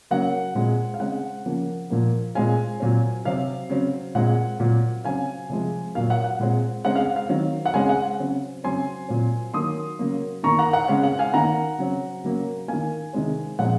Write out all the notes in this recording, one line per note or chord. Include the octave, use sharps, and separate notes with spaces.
C#3 F#3 A#3 F#5
A#2 G#3 C4
F5
C#3 G#3 C4 F#5
C#3 F3 A#3
A#2 F3 A#3
A#2 G#3 C4 F5 G#5
A#2 F#3 C4
C3 F#3 C4 F5
C#3 F#3 C4
A#2 G#3 C4 F#5
A#2 F#3 C4
C#3 F#3 C4 F5 G#5
C3 F3 G#3
A#2 F#3 A#3 F5
F#5
F#5
A#2 G#3 C4
C#3 G#3 C4 F#5
F5
F5
D#3 F#3 C4
F#5
C#3 G#3 C4 F5 G#5
F#5
C#3 F#3 C4
C#3 F#3 C4 G#5 C6
A#2 F#3 C4
D#3 F#3 A#3 C6 D#6
C#3 F#3 A#3
D#3 A#3 A#5 C#6
F#5 A#5
F#5
C#3 G#3 C4 F5
F#5
F5 G#5
D#3 A#3 F#5 A#5
C#3 F#3 C4
C#3 F#3 A#3
D#3 A#3 F5 G#5
C3 D#3 G#3 C4
A#2 F3 G#3 C4 F#5